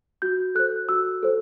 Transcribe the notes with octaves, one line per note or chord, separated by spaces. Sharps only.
F#4 G6
A4 C5 F#6
F#4 E6
A4 C5